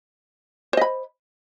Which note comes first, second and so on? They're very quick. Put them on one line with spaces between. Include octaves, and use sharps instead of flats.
C5 D#5 B5